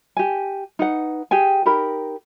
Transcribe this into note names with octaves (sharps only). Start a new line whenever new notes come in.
G4 G#5
D#4 B4 F#5
G4 G#4 G5 G#5
D#4 G4 A#4 B5